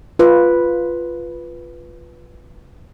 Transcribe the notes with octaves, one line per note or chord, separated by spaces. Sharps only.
F4 B4